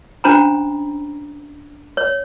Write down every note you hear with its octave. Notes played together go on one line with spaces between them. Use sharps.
C#4 D4 C5 G#5 A#5 B5
C#5